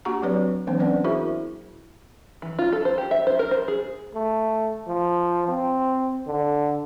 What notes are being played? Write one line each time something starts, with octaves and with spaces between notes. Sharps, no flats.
A#3 D4 F#4 G4 F#5 A#5
F#3 C4 F#4 B4 C#5 D5
E3 F#3 A#3 C4 D4 C5
B3 C#4 B4 D5 F#5
E4 F#4 G#4 A#4 C5 E5
E3
F4
A4
C5
G4
E5
C5
A#4
C5
G#4
A3
F3
C4
D3